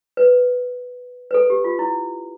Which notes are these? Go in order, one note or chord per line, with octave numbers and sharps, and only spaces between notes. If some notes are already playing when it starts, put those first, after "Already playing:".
B4
B4
A4
G4
F4
E4